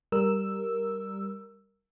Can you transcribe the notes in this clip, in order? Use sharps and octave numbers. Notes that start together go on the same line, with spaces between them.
G3 A#4 E6